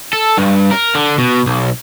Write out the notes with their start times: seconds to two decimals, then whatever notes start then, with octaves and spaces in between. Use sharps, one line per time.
0.13 A4
0.37 G2
0.71 A#4
0.95 D3
1.18 B2
1.46 B1